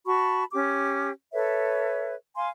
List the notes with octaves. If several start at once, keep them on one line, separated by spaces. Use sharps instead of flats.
F#4 A5 B5 C#6
C#4 G4 D6
A4 B4 C#5 E5
F5 G#5 C6